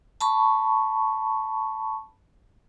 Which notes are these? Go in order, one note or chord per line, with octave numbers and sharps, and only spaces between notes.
A5 B5 C#6